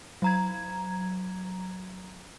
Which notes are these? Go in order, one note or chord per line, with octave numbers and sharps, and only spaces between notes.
F#3 A#5 G#6